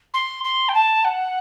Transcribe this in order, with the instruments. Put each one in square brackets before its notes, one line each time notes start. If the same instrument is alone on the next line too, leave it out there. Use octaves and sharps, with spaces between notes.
[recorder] C6
C6
G5
A5
F#5